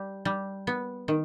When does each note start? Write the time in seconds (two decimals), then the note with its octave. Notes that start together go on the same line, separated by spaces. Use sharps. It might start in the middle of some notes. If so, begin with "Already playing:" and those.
Already playing: G3
0.25 G3
0.67 B3
1.08 D#3